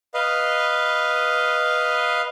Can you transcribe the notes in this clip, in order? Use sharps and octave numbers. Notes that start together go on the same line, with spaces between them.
B4 D#5 F5